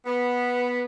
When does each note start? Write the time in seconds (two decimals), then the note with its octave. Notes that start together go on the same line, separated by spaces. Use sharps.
0.06 B3